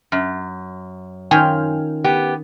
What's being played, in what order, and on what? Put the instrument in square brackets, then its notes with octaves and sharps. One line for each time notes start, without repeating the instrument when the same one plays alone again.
[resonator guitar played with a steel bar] F#2
[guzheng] D#3 C#4 F4 [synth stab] G5 G#5 F6
[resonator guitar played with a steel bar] B3 G4